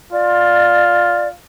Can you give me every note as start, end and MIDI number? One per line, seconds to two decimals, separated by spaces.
0.13 1.34 65
0.13 1.28 74